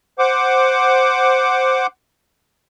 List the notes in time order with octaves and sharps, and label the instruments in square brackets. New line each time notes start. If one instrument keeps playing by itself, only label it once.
[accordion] C5 F#5 D6